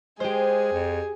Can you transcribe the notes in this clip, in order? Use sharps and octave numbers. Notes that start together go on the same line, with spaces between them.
G#3 G4 G#4 C5
F2